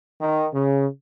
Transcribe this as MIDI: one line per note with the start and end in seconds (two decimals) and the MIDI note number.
0.21 0.47 51
0.55 0.87 49